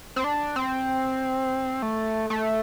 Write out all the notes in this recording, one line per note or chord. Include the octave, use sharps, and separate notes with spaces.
C4
D4
C4
A3
A3